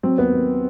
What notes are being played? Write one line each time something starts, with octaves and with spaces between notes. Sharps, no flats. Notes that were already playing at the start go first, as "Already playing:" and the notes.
F#3 C4
D#2 B3
D#2